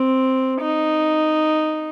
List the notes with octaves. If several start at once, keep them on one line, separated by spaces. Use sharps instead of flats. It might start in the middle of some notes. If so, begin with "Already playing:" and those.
Already playing: C4
D#4